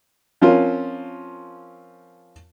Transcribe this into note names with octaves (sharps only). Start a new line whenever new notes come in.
F3 C4 C#4 F4 A#4